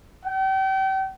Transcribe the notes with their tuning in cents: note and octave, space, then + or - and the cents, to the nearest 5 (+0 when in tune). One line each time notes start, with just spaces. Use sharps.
G5 -35